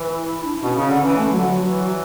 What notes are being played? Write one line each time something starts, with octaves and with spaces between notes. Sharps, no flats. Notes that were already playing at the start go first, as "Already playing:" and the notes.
Already playing: E3
E4
D4
D4
B2 C#4
C#3
C#4
D3
E3 C#4
A3
D3 F#3
F#3
E3 F#3